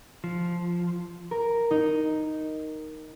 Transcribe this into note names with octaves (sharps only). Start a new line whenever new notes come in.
F3
A#4
D#4